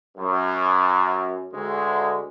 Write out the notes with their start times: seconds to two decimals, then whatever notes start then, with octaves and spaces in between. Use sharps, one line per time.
0.18 F#2
1.52 D2 G#3